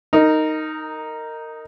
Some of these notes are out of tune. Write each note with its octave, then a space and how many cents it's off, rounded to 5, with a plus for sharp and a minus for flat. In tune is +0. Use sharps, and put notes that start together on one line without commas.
D#4 +0 A#4 -20